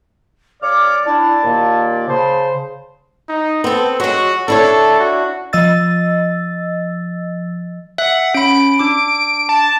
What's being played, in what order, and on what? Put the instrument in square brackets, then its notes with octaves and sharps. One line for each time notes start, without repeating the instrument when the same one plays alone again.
[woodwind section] C#3 C#5 F6 [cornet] D5 [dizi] D6
[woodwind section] D4 E4 [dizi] A5
[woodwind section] D#2 A#2 A#3
[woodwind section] C#3 [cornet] C5 [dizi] A5
[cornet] D#4
[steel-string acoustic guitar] B3 A4 [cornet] C4
[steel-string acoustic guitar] F#3 G#3 [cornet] F#4
[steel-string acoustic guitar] D4 E4 C#5 [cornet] A4
[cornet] F#4
[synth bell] F3 D#5 E6 A6
[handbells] E5 [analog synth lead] F#5
[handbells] C#4 B5 [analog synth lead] D7
[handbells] D4 D6
[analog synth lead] A5